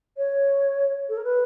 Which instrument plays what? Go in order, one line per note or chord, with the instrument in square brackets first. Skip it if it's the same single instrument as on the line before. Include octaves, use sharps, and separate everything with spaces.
[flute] C#5
A4
A#4
B4